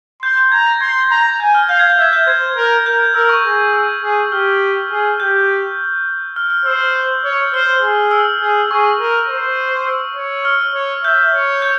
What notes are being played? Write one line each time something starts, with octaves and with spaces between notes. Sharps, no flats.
C6 G6
G6
A#5 G#6
A#6
C6 G#6
A#5
G#5 G6
F6
F5 G6
G#6
G6
E5 G#6
G6
C5 G#6
A#4
A#4 G6
A#4 E6
C#6
G#4
E6
G#4
G4 F6
G#4
G4 G6
F6
F6
C5 E6
F6
G6
C#5
C5 F6
G#4
E6
G#4
G#4 C#6
A#4
C5
E6
C#5
F6
C#5
E5 G6
C#5
G6